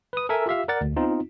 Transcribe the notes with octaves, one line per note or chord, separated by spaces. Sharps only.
B4 D#6
A4 A#4 E5 G#5
F4 G4 E5 F5
A#4 D5 F#5 A6
D2
B3 C4 D#4 F4